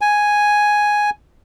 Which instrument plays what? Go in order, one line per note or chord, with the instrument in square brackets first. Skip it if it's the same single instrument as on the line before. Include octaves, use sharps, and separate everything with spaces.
[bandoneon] G#5